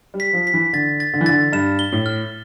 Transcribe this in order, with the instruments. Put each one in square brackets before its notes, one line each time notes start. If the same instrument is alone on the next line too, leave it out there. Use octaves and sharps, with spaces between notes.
[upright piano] G3
[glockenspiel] B6
[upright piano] F3
[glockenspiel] B6
[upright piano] E3
[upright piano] D3 [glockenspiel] A6
[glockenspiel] A6
[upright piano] D3
E3
[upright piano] D3 [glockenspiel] A6
[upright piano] G2 [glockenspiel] E7
[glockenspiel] G7
[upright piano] A2
[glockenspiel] F6